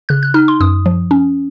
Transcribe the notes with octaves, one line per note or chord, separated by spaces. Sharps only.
C#3 F#6
F#6
D#4 F6
C6
F#2 D#6
F3
C#4